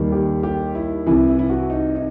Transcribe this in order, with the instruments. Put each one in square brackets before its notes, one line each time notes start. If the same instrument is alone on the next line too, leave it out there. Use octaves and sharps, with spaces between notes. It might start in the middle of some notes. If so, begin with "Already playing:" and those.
Already playing: [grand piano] D#2 D#3 G3
G4
G4
E4
C2 C3 E3 E4
E4
E4
F#4
D#4
D#4